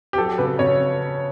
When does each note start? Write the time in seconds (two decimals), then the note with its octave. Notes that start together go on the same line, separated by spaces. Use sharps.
0.13 G4
0.18 F#3 A4
0.38 C#3 B4
0.59 C#3 C#5